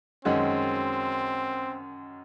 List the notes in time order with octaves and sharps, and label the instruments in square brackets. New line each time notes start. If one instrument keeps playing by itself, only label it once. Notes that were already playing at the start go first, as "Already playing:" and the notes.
[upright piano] F#2 D#3 G#3 C#4 F#4 [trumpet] C4